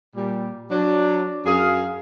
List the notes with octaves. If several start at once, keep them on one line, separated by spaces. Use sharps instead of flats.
A#2 G3
F#3 D4
F#2 G#4 F5